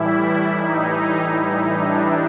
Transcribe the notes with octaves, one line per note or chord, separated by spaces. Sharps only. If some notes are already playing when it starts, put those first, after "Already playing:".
Already playing: A2 E3 G3 E4
D#4
D#4
D4